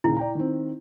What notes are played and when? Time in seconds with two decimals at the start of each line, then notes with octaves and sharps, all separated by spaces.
0.04 D#2 A#2 C#3 E4
0.17 D5 G5 A#5
0.35 D#3 C4